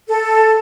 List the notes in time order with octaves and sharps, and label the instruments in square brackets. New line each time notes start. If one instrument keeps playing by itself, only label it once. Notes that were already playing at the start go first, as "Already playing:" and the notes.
[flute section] A4